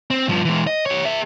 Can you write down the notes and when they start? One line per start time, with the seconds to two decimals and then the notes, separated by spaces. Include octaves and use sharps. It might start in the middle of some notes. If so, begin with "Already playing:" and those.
0.11 C4
0.29 G2 F3
0.45 E3 G#3
0.67 D#5
0.86 G4 C#5
1.05 G#4 E5